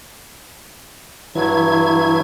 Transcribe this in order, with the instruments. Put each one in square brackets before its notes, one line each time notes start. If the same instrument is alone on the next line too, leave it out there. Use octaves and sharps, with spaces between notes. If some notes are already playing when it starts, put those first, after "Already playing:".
[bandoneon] G2 F#3 [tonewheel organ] E3 E4 G#6